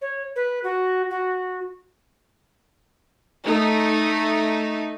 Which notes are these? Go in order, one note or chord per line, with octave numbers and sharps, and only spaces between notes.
C#5
B4
F#4
F#4
A3 D#4